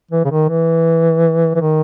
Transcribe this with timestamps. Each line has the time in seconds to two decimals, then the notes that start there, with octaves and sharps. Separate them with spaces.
0.11 E3
0.25 C#3
0.31 D#3
0.49 E3
1.55 E3
1.61 D#3